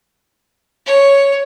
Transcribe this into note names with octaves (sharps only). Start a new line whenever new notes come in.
C#5